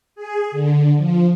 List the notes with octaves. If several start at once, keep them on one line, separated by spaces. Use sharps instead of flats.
G#4
D3
F3